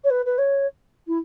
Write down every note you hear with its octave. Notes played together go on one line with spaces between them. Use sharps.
C#5
B4
B4
C#5
E4